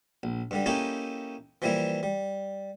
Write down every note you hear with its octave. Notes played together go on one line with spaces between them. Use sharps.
A#1
G2 D3 G3
A#3 C#4 D#4 E4 G4 A4
E3 F3 G3 A#3 E4
G3